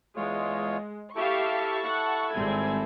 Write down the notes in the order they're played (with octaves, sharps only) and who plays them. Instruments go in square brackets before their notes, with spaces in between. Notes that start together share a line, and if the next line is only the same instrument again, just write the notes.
[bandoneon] E2 F4 C#5 [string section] G#3
[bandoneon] E4 A4 [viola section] G4 E5 F5 [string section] A5 C#6
[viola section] F#5
[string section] G#1 G#5 G#6 [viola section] G3 C4